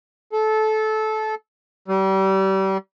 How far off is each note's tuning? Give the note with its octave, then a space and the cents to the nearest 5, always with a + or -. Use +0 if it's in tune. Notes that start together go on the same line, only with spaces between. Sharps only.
A4 -20
G3 -30